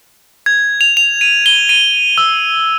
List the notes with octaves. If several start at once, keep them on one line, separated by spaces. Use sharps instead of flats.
G#6
F7
F7
D#7
G7
D#7
E6